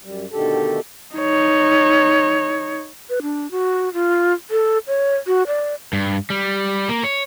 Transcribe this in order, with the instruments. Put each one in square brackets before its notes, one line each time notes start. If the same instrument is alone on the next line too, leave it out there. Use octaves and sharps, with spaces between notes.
[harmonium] F#2 G3
B2 D3 D#3 A3 G4 A4
[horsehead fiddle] D#4 C#5
[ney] B4
D4
F#4
F4
A4
C#5
F#4
D5
[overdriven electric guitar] G2
G3
A#3
C#5